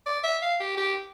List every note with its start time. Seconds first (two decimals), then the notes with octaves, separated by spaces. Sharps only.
0.06 D5
0.24 E5
0.42 F5
0.60 G4
0.77 G4